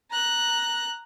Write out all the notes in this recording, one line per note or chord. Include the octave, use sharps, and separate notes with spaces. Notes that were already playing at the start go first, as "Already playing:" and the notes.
A#5 F#6